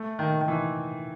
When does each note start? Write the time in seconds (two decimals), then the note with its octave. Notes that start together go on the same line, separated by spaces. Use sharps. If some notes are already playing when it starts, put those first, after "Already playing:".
Already playing: A3
0.19 D#3
0.41 D#3
0.48 E3